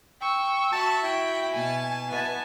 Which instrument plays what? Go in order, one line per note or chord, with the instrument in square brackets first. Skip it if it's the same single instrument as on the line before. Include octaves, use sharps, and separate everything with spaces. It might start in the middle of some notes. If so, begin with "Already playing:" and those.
[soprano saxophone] G5 [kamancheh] C#6 E6
[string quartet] F#4 E5 [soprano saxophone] A5
[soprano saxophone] E4 [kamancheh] G5
[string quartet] B2 A5 [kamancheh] G#5
[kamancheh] B3 [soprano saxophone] E4 [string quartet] G#5 A5